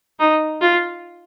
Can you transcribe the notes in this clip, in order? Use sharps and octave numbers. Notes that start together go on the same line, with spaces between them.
D#4
F4